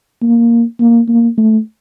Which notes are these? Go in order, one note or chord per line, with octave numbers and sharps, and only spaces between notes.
A#3
A#3
A#3
A3